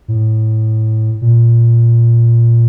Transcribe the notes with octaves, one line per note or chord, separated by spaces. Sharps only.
A2
A#2